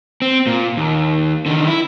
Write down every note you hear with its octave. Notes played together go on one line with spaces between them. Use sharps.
C4
A#2
D#2
D3 D#3
E4